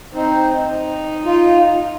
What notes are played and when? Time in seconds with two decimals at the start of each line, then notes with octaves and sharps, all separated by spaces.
0.15 C4 D#4
0.69 D#4
1.25 F4